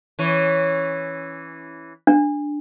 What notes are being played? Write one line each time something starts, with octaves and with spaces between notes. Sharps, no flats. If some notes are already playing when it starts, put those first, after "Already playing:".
E3 C#4
D4